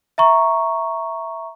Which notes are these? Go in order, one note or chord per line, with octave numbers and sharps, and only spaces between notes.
E5 A#5 C#6